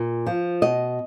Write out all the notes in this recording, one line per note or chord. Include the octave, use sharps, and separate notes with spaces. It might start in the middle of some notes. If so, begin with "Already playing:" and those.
Already playing: A#2
F3
B2 D#5